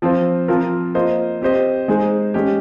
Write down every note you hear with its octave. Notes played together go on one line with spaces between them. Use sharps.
F3 C4 F4 C5
F3 C4 F4 A#4
A#3 F4 C5 D#5
C4 G4 C5 D#5
G#3 D#4 G#4 C5
G#3 C#4 G4